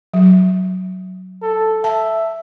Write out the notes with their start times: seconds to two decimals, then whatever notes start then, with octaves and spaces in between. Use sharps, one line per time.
0.14 F#3
1.42 A4
1.84 E5 A5